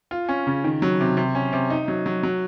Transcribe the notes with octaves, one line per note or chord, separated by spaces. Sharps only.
F4
C#4
C#3
D#3
F#3
C3
C3
C#4
C3
D#4
F#3
F#3
F#3